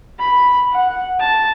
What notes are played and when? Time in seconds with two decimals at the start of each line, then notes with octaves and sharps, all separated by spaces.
0.19 B5
0.72 F#5
1.20 A5